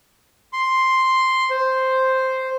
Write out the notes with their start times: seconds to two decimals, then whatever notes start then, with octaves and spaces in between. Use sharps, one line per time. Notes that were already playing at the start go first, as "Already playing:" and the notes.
0.53 C6
1.50 C5